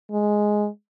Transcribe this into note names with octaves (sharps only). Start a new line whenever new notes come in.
G#3